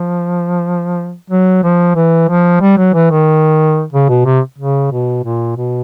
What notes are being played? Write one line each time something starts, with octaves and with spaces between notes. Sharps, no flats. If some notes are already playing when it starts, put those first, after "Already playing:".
Already playing: F3
F#3
F3
E3
F3
G3
F#3
E3
D#3
C#3
B2
C3
C#3
B2
A#2
B2